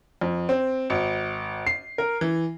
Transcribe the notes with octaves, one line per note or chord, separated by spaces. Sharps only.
F2
C4
G#1
C7
A#4
E3